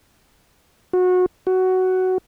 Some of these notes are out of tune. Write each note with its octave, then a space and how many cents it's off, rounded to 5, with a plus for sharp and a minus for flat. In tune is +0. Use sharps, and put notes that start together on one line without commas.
F#4 -25
F#4 +10